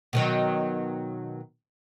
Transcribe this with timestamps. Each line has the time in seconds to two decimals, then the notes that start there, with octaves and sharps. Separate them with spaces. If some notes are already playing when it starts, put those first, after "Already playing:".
0.13 B2 D#3 F#3